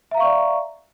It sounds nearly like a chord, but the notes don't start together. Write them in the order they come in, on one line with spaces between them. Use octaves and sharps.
E5 A#5 F5 C#6 D5